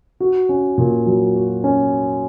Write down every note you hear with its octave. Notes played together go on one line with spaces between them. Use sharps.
F#4
C#4
A#2
F#3
F#4
C#4